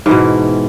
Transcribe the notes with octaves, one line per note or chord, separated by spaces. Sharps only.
G#2 B2 E3